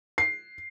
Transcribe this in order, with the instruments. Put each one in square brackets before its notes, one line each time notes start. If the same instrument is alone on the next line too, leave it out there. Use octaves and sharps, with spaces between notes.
[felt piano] C7